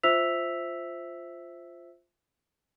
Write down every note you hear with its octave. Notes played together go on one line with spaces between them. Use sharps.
F4 C5 E5 E6 B6 F7